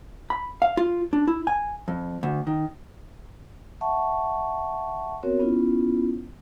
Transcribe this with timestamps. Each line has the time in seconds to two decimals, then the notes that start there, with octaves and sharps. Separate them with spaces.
0.30 B5
0.62 F5
0.77 F4
1.13 D4
1.27 E4
1.47 G#5
1.88 F2
2.23 D2
2.47 D#3
3.81 E5 F#5 A5 C#6
5.23 B3 C4 F#4 A#4 C#5
5.39 B3 C#4 E4 F4